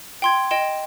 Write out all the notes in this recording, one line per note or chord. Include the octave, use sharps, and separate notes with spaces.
G5 C6 G#6
D#5 G5 E7 G7